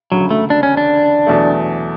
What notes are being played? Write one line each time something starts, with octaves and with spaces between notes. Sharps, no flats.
E1 D2 C#3 F#3
A3
D4
C#4
D4
E2 B2 F#3 A3